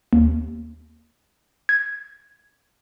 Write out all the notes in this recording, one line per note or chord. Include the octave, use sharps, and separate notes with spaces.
D#2
G#6